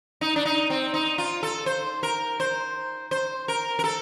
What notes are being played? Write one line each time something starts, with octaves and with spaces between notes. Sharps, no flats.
D#4
D4
D#4
C4
D#4
F4
A4
C5
A#4
C5
C5
A#4
A#4
A4